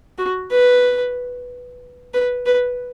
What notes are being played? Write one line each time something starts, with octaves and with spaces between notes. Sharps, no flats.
F#4
B4
B4
B4